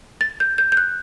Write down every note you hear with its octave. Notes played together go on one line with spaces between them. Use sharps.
A6
G6
G6
G6
F#6